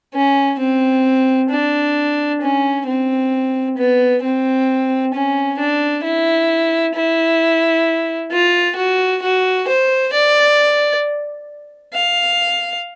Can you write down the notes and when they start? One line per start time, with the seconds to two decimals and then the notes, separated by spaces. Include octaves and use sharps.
0.14 C#4
0.59 C4
1.50 D4
2.42 C#4
2.87 C4
3.78 B3
4.23 C4
5.14 C#4
5.59 D4
6.04 E4
6.95 E4
8.32 F4
8.76 F#4
9.22 F#4
9.68 C5
10.13 D5
11.94 F5